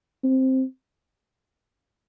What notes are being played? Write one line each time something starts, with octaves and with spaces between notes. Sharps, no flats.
C4